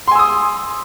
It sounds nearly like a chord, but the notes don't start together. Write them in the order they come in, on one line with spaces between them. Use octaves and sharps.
C6 G#5 E6 D#6